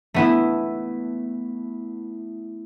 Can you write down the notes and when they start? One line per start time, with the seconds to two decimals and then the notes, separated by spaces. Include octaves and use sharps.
0.14 A3 B3 E4